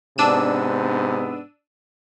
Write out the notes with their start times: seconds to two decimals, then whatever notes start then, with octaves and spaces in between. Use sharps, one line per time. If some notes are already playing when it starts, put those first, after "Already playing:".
0.18 G#2 C3 B3 D4 E6 D#7